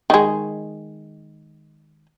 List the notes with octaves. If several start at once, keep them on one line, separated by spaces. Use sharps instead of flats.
D#3 G#3